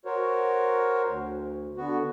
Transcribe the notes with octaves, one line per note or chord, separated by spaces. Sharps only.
F#4 A#4 C5 C#5
D2
D3 B3 F#4